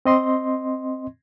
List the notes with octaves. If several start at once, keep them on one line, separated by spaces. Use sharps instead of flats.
C4 D#5 C6